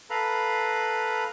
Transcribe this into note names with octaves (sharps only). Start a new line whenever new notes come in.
A4 B4 F5 A#5 B5